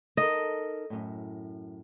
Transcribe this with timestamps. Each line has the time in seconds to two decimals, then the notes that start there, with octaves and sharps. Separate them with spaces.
0.17 D#4 A4 A#4 D#5
0.90 F#2 A2